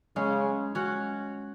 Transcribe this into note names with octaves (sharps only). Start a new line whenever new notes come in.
C#3 G#3 C#4
C#4 F#4